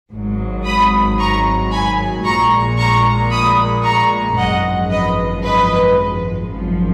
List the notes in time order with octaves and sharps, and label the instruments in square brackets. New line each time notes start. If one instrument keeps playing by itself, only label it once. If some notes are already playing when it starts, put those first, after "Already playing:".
[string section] G#1 G#2 F#3
B5 D#6
A#5 C#6
G#5 B5
A#1 A#2 G#3 A#5 C#6
A#5 C#6
B5 D#6
A#5 C#6
G#1 F#2 F3 G#3 D#5 F#5
B4 D#5
B4 D#5
G#1 F#2 F3